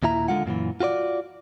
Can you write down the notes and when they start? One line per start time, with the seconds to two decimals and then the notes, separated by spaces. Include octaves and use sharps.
0.03 D#2 A#2 E4 A#5
0.28 D3 G#3 F4 F#5
0.46 F#2 A#2 D#3 E3
0.80 F4 F#4 C5 D5